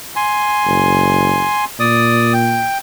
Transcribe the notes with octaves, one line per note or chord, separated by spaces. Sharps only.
G#5 C6
F#1
A#2 D5 D#6
G5